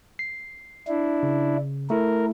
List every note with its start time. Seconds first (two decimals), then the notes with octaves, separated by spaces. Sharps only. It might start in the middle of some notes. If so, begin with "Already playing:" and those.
0.19 C7
0.88 D4 E4
1.23 C#3
1.90 A3 E4 A#4